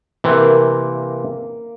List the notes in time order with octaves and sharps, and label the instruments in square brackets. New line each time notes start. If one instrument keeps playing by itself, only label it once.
[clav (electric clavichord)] C3 E3 [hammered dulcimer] A#3